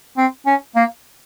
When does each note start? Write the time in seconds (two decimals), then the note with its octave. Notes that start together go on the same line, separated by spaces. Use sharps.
0.17 C4
0.46 C#4
0.76 A#3